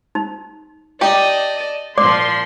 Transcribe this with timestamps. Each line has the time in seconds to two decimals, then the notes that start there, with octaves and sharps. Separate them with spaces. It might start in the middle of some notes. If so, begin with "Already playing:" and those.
0.15 D#4
1.01 D#4 G4 D5 D#5 G5 A5
1.98 A#2 F3 D5 C6 D6